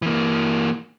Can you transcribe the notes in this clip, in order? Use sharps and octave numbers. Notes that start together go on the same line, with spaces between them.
E3 A#3